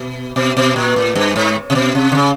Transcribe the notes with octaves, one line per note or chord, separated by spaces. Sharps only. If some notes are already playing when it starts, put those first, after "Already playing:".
Already playing: B2
B2
B2
A#2
A2
G2
G#2
C3
B2
C3
D3
C#3